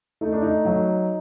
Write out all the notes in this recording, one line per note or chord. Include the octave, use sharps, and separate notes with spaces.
A3 D#4
D4
D#4
F#3